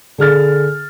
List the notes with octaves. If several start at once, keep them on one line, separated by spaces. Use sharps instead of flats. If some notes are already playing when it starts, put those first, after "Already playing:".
D3 G#4 F6 A6